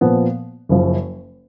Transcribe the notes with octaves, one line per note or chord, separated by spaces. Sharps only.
A#2 F3 B3
F#1 F#2 F3